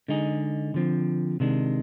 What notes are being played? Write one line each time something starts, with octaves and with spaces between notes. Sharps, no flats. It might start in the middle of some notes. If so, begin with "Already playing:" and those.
D3 G#3 D#4 G#4
D3 F3 C4
C3 D#3 G#3 D4